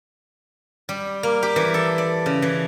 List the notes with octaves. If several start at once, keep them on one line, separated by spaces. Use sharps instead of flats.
G3
A#3
G4
E3
A4
D5
C#3
E3